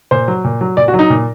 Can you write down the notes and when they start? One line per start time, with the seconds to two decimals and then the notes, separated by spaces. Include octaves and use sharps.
0.11 A#2 C5
0.28 F#3
0.44 A#2
0.61 F#3
0.77 A#2 D5
0.88 F#4
0.94 F#3
0.99 D#4
1.10 A#2